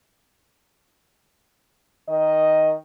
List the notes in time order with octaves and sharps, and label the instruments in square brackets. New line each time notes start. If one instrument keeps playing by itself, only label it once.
[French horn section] D#3 D#5